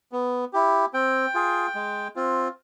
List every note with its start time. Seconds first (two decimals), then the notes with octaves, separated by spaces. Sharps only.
0.12 B3
0.53 E4 G4
0.94 C4 G5
1.34 F4 G#4
1.75 G#3
2.16 C4 F4